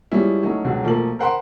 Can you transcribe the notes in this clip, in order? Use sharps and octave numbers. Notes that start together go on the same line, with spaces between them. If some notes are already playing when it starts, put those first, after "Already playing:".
F3 G3 G#3 C#4 E4
F#3 A3 C#4 D#4
C#2 B2 D3 F#3
B1 F3 A3 A#3 F#7
A#4 C5 F#5 G5 B5 C6